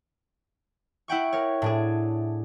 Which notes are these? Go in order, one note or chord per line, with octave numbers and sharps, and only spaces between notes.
E4 F#5 G5 C#6
A#4 C#5
A2 D4 G#4